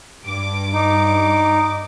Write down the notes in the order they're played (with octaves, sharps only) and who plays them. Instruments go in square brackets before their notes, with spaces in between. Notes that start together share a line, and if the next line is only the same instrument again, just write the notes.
[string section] G2 D6
[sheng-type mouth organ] D#4